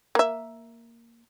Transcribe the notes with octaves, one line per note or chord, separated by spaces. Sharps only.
A#3 E5